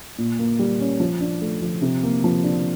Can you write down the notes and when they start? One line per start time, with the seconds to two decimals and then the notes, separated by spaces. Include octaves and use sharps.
0.18 A#2
0.39 A#3
0.59 G3
0.80 C#4
1.00 F3
1.21 D4
1.41 A3
1.62 F3
1.82 C3
2.03 A#3
2.24 F3
2.44 D4